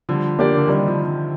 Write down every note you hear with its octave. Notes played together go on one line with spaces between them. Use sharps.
D3 F3 G3
A#3 D4 G4 D5
D3
C3 D#3 G3
D3 F3